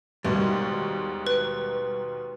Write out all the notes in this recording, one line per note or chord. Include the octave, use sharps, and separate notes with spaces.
D#2 G#2 B2 G3
B4